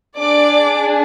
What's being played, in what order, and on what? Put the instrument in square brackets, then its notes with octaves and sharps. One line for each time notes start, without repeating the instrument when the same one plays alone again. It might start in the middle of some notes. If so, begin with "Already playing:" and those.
[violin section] D4 G#4 D5 D6